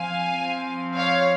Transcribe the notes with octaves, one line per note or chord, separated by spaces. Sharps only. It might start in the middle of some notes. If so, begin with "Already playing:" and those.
Already playing: F3 C4 F5 G#5
F3 C4
C#5 F5